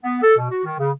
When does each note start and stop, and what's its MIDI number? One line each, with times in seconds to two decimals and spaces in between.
0.04 0.18 59
0.22 0.37 69
0.37 0.47 47
0.51 0.62 66
0.65 0.75 51
0.79 0.91 49